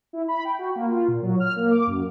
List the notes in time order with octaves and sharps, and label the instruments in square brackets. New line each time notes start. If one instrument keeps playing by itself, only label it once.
[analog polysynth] E4
B5
G5
F#4
A#3
F4
A#2
F#3
F6
A#3
D6
F#2